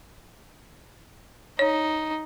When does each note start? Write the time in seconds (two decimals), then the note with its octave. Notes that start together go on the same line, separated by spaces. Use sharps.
1.59 D#4 C#5